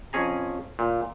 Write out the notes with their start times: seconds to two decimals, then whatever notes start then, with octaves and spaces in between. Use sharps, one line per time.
0.13 F2 C#4 G#4 A#5
0.79 A#2